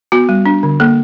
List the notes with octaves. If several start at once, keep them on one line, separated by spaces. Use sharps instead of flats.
B3 F#4
G3
D4
D3
A#3 A4